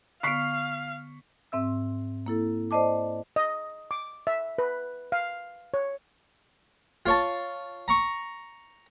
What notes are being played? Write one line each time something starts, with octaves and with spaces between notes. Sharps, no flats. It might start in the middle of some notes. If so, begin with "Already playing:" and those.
D3 B3 F5 C#6 B6 C7
G#2 C4 E5 E6
A#3 E4 A4
C5 D5 D#5 A5 D6
D#5
D6
E5
B4
F5
C#5
F4 C#5 A5
A#5 C#6